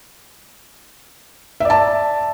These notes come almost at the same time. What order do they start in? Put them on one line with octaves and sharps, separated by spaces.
E5 D5 A5